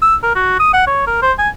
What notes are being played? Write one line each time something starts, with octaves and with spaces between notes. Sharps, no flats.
E6
A#4
F#4
D#6
F#5
C#5
A#4
C5
G#5